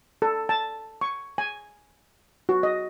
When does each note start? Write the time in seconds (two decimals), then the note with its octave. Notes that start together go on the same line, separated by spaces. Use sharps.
0.22 A4
0.49 A5
1.01 C#6
1.38 G#5
2.49 F#4
2.63 D#5